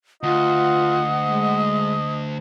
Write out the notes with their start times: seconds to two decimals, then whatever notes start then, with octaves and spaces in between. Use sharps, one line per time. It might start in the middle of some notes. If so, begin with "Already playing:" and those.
0.23 D2 F4 D#5 F#5
1.25 G#3